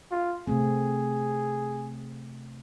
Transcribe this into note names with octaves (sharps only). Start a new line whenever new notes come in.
F4
C3 A3 C4 G#4